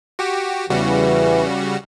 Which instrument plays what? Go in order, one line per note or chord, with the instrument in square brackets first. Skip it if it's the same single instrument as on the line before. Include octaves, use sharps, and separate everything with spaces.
[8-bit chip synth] F#4 G4
[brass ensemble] E2 E3 [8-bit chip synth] C#3 G3 F#4